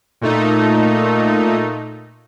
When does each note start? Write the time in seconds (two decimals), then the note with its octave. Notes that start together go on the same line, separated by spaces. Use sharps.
0.21 A#2 A3 D#4